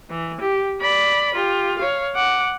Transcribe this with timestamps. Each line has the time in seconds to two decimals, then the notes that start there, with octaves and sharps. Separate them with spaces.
0.10 E3
0.40 G4
0.81 D5 B5
1.34 F4 G4
1.79 C#5 F5
2.15 F#5 D6